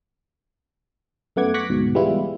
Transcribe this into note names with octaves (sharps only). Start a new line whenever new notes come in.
F#2 A3 B3 F#5 D6 G#6
C#6 D6 F#6 G#6 A#6 B6
D2 G#2 B2
E3 G3 G#3 B3 E4 F4